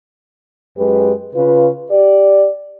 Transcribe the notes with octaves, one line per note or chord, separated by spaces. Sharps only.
F#2 G#3 G4 B4
C#3 F4 B4
G4 D5